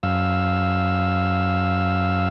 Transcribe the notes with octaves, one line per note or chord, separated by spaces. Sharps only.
F#2 F5 E6